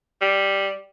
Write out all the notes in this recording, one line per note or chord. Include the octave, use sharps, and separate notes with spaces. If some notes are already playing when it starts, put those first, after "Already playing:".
G3